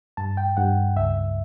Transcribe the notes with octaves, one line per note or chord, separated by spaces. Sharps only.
G2 A5
G5
G2 F#5
C#2 E5